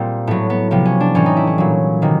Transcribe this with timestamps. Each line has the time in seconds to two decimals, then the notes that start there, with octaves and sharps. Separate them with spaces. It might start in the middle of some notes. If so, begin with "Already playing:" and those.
Already playing: A#2 G3 C4
0.27 A2 F#3 B3
0.50 B3
0.71 C3 F3 B3
0.85 C#4
1.00 D4
1.15 A2 E3 G3 C#4
1.26 D#4
1.37 E4
1.47 C#4
1.58 A#2 F#3
2.02 C3 D#3 F#3